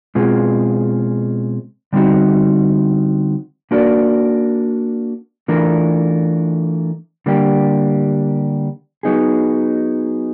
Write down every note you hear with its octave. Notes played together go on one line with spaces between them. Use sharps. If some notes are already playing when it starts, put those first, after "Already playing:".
B2 G#3 C4 F4 G#4
D3 G3 C4 D#4 F#4
A#3 D4 F#4 A#4 D5
E3 A3 D4 F4 A#4
D3 G3 A#3 D4 G4
F#3 B3 D#4 G#4